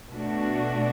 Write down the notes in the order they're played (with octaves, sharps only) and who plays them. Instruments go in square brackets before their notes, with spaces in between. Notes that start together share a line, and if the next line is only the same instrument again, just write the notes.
[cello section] B2 A3 D4 F#4